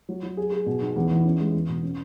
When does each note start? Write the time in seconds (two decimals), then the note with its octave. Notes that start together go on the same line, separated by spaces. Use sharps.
0.09 F#3
0.23 F#3
0.37 G#4
0.52 G#4
0.66 B2
0.82 B1
0.96 E2
1.11 E3
1.25 C#4
1.40 G#3
1.54 E2
1.68 B2
1.83 C#4